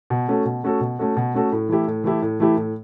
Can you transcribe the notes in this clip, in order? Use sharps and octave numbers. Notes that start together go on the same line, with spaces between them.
B2
A3 C#4 F#4 A4
B2
A3 C#4 F#4 A4
B2
A3 C#4 F#4 A4
B2
A3 C#4 F#4 A4
A2
E3 A3 E4 G4
A2
E3 A3 E4 G4
A2
E3 A3 E4 G4
A2